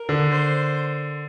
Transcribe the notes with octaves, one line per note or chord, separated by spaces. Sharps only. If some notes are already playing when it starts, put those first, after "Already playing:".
Already playing: A#4
D3
C5